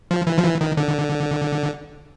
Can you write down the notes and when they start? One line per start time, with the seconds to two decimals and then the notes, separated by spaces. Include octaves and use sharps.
0.11 F3
0.27 E3
0.38 F3
0.44 E3
0.61 D#3
0.77 D3